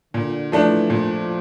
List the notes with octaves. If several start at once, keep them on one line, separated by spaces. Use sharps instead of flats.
A#2 D3
E3 F3 A3 D4
A#2 F3